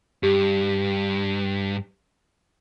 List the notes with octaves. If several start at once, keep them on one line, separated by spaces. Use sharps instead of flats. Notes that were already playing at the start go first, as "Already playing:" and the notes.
G2 G4